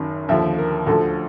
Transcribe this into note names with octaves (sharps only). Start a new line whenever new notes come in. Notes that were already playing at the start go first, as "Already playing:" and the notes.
Already playing: F#1 F#2 D#3
D#2 D3 F3 E5
A#4
D2 D3 F3 A4